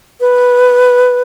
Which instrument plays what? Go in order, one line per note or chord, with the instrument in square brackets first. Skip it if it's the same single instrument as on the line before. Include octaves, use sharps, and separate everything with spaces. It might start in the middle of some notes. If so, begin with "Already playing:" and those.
[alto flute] B4